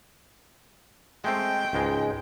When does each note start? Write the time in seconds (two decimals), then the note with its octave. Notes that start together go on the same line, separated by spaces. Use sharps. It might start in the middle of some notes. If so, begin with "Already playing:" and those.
1.24 G#3 A3 C4 G5
1.73 C#2 G#2 G#3